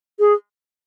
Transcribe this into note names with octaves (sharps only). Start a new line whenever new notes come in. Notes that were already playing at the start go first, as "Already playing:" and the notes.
G#4